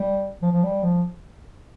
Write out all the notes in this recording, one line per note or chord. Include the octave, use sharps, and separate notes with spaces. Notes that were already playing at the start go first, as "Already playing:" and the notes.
Already playing: G3
F3
F3
G3
F3